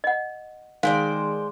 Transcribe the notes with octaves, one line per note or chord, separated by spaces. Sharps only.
D#5 F#5
D#3 G#3 C5 D5 F5